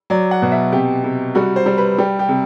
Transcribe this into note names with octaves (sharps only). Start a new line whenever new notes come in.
F#3 D5
F#5
B2
E5
C3 G4
C3
G3 F#4
C5
G3
B4
G3 G4
G4
C3